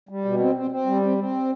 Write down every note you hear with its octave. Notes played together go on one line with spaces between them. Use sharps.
G3
B2
C4
C4
C4
G3
C4
C4